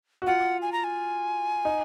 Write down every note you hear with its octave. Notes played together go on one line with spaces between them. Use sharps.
F#4
F4 F#5
G#5
A#5
G#5
D#4